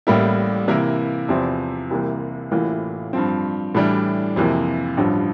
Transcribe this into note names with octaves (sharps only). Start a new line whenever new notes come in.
A1 A2 G3 A#3 E4
C3 E3 A#3 E4 A#4
E2 C3 F3 C4 E4
C2 C3 E3 A#3
A1 A2 E3 A#3 F4
G2 F3 C4
A2 E3 G3 D4
F2 C3 E3 A#3
A1 G2 D3 F3